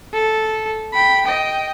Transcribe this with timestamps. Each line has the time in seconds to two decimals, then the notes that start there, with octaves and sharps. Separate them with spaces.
0.14 A4
0.93 G5 B5
1.25 D#5 G5